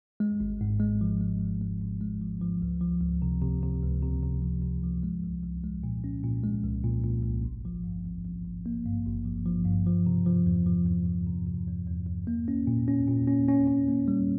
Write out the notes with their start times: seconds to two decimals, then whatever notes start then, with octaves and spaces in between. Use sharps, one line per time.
0.20 G#3
0.40 G#1
0.61 G#2
0.80 G#3
1.01 F3
1.21 G#3
1.40 G#1
1.61 G#3
1.81 G#1
2.01 G#3
2.21 F3
2.42 F3
2.62 C#2
2.81 F3
3.01 C#2
3.22 C3
3.41 C3
3.63 C3
3.83 C#2
4.03 C3
4.23 C3
4.42 F3
4.62 C3
4.83 F3
5.03 G#3
5.23 C2
5.43 C2
5.64 G#3
5.83 A#2
6.04 C#4
6.24 A#2
6.44 G#3
6.64 C2
6.84 A#2
7.04 A#2
7.24 C2
7.45 G#1
7.65 F3
7.84 G2
8.05 F3
8.25 F3
8.45 G#1
8.66 A#3
8.86 G2
9.06 G#1
9.25 F3
9.46 F3
9.65 G2
9.86 F3
10.07 C3
10.26 F3
10.46 E2
10.66 F3
10.87 E2
11.06 F3
11.27 C3
11.47 C3
11.67 E2
11.87 E2
12.07 E2
12.27 A#3
12.48 C#4
12.67 A#2
12.88 C#4
13.08 A#2
13.28 C#4
13.48 C#4
13.67 C#4
13.88 A#3
14.08 G3